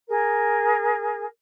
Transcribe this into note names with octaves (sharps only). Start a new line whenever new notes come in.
G#4 A#4